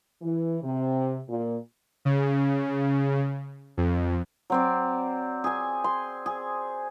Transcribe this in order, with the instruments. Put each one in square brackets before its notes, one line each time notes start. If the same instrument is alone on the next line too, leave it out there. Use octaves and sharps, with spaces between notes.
[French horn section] E3
C3
A#2
[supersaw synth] C#3
F2
[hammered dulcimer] F#3 C4 D5
G#4 G#5
C6
G#4